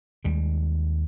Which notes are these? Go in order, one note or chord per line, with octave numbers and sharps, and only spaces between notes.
D#2 G3 G#3